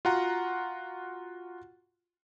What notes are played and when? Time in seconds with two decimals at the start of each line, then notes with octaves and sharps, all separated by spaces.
0.05 F4 F#4 F#5 A#5